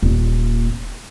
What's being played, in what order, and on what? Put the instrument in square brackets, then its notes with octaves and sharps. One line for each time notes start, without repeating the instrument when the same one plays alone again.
[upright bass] D#1 A#2